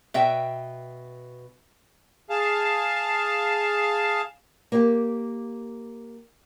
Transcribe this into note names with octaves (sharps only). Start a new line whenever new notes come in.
B2 E5 G5
G#4 F5 A5
A#3 G4